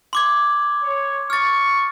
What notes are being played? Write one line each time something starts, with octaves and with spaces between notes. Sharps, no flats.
C6 D6 G#6
C#5
C#6 F6 A6